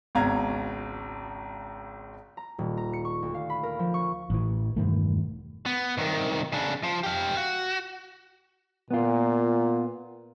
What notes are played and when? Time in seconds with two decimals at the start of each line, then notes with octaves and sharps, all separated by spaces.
0.15 G#1 C#2 B2 F5 A#5 G#6
2.37 A#5
2.59 D#1
2.77 A#5
2.93 C#7
3.05 C#6
3.22 D2
3.34 F5
3.50 B5
3.63 A#4
3.79 F3
3.94 C#6
4.30 A1 E3
4.76 E1 G2 D#3 A3
5.66 B3
5.97 C2 D#3
6.53 C#3 D4
6.83 F3
7.03 G4 F5
7.37 F#4
8.91 A#2 B3 F4